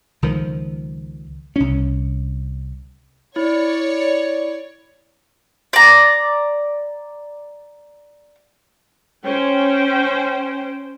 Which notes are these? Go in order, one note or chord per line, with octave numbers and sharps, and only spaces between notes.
C#2 D#3 F3
C2 C#4
E4 C#5 D5
D5 A#5
C#4 C5 G5